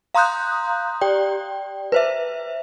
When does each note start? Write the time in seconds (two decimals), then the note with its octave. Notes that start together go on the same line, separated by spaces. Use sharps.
0.15 F5 A#5 C6 D#6 F#6 G6
1.01 G4 D5 G5
1.92 B4 C5 E5